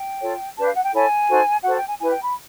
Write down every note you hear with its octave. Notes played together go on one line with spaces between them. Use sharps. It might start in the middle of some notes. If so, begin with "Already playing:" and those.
Already playing: G5
F4 A4 C#5
D4 G4 B4 A5
F5
F#5
G5
E4 A4 C#5 G#5
D#4 F#4 A4 C5
F#4 A4 C5 F#5
G5
G#5
E4 G4 B4 G#5
G5
B5